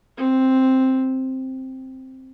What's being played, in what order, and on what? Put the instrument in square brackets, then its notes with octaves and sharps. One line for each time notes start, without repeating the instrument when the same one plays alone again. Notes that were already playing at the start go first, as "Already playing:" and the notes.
[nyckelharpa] C4